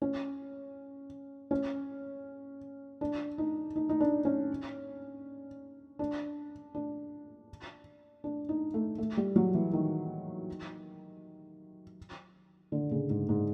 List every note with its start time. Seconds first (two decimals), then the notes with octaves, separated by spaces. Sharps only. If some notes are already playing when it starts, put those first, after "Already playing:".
0.02 C#4
1.51 C#4
3.01 D4
3.38 D#4
3.76 D#4
3.89 D#4
4.00 D4
4.25 C#4
5.99 D4
6.75 D4
8.24 D4
8.49 D#4
8.74 A3
8.98 A3
9.17 G3
9.36 F#3
9.54 E3
9.73 D#3
12.72 D3
12.91 C#3
13.10 G#2
13.29 G#2